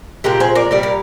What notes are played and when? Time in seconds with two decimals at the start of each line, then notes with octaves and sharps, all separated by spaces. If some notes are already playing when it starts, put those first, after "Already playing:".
0.24 A#2 F3 G#3 G4 A#4
0.40 G#4 C5
0.55 A#4 D5
0.71 A#2 G3 A#4 D5
0.83 A#4